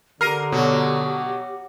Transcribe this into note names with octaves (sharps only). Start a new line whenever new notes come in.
D3 G4 A#4 F6 C7 D#7
B2 F#3